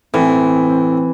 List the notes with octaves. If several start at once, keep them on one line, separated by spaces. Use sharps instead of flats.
A2 E3 C4